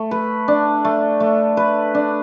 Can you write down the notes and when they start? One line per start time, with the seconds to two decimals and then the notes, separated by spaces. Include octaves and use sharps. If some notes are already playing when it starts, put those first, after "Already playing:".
Already playing: A3
0.11 B4
0.48 D4
0.85 A3
1.20 A3
1.57 B4
1.95 D4